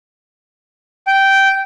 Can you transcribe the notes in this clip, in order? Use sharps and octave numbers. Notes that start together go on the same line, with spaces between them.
G5